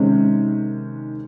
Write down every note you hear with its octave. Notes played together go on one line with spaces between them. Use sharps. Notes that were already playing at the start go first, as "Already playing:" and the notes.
Already playing: C3 D#3 G#3 C#4